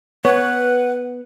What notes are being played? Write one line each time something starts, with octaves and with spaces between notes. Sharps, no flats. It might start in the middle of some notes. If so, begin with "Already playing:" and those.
B3 B4 C#5 F#5